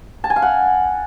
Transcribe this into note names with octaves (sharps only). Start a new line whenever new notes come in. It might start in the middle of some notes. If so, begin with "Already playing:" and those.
A5
G#5
F5
F#5